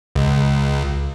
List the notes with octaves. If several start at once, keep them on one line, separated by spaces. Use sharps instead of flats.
C#2